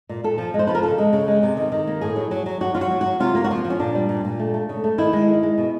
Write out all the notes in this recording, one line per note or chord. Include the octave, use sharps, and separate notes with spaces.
A#2
A#2 A4
F3
G#3
C5
F3 B4
A#4
C#3 A4
G#3
C#3
G#3
C3
D#3
D#3
A#3
A2 G#4
F#3
F#3
F#3
F#3 F#4
F#3 F4
F#4
F#3
F#3 F#4
C3 F4
A#3
F#4
F3 F4
F3
C#4
A#2 D4
G3
A#2
A#2
A3
A3
C#3
A3
D#3 E4
G#3
D#3
G#3
B2